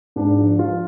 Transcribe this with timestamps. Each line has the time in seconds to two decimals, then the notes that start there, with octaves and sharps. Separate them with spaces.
0.16 G#2 D4
0.38 F3
0.59 F3 F4